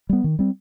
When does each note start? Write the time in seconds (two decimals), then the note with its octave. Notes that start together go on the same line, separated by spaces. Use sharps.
0.09 G3 B3
0.24 D#3
0.39 G3 C4